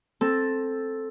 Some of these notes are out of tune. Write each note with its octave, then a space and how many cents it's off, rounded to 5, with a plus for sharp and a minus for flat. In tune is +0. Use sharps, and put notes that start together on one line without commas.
C4 +10 A4 +0